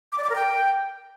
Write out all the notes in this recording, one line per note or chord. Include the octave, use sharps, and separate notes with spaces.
D6
D5
D6
A#4
G5